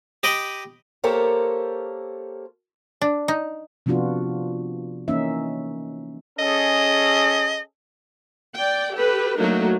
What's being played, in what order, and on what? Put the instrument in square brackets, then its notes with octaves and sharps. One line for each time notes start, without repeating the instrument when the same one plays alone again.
[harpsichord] G4 D#5 G5 B5
[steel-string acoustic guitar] A#3 G4 A4 A#4 C5 C#5
[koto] D4
D#4
[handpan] C3 F3 B3 D4 F4 F#4
E3 A#3 C#4 D#4 E5
[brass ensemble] C#4 G#4 A4 [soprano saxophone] D#5
[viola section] D5 G5
G4 A4 B4
F#3 A3 A#3 D4 D#4 A#4